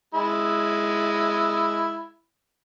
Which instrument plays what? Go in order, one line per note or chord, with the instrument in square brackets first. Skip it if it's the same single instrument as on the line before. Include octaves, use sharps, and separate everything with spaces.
[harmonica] G#3 E4